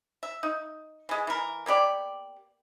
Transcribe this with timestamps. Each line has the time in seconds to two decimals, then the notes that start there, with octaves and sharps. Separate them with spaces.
0.23 E5
0.43 D#4
1.09 E3 G#3
1.27 E3 A#4
1.66 A#3 B3 G4 D5